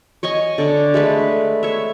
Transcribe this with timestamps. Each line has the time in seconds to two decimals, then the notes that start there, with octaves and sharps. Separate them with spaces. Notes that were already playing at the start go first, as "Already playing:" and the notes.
0.23 C#5 D#5 G#5 C#6
0.58 D3 D4
0.94 G#3 A3 B4
1.63 C#5 E5